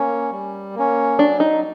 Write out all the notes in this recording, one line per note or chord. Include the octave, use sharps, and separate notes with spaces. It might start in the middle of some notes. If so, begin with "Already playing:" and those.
Already playing: A#3 C#4
G3
A#3 C#4
F#3 D4
D#4